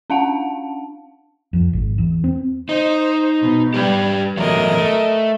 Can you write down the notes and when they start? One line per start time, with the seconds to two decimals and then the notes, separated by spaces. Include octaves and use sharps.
0.10 C#4 D4 F5 F#5 A5
1.53 F2
1.73 G#1
1.98 E2
2.24 C4
2.69 D#4 C5
3.41 B2
3.74 G3 G4 B4 G5
4.37 E2 F#3 A3 A#4 D#5
4.78 A3